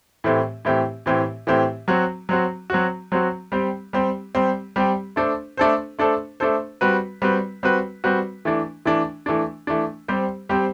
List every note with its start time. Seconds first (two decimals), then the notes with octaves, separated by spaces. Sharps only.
0.24 A2 E3 A3 C4 G4
0.65 A2 E3 A3 C4 G4
1.06 A2 E3 A3 C4 G4
1.47 A2 E3 A3 C4 G4
1.88 F#3 C4 F#4
2.29 F#3 C4 F#4
2.70 F#3 C4 F#4
3.12 F#3 C4 F#4
3.52 G3 C4 G4
3.93 G3 C4 G4
4.35 G3 C4 G4
4.76 G3 C4 G4
5.16 A3 D4 A4 C5
5.57 A3 D4 A4 C5
5.99 A3 D4 A4 C5
6.40 A3 D4 A4 C5
6.81 G3 C4 F#4 B4
7.22 G3 C4 F#4 B4
7.63 G3 C4 F#4 B4
8.04 G3 C4 F#4 B4
8.45 E3 A3 D4
8.85 E3 A3 D4
9.26 E3 A3 D4
9.67 E3 A3 D4
10.08 G3 C4 G4 C5
10.49 G3 C4 G4 C5